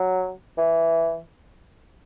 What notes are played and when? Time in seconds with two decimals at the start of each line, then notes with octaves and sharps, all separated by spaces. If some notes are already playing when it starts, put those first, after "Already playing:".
Already playing: F#3
0.58 E3